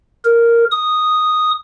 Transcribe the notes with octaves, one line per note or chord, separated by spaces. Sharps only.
A#4
D#6